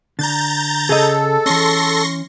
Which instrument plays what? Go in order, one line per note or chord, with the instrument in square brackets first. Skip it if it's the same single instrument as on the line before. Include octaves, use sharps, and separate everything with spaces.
[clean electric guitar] D3 [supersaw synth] A#5 G6 A6
[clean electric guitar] C#3 [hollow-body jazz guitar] G#4 D#5 [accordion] A4
[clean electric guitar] E3 C#4 [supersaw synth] C6 C#6 A#6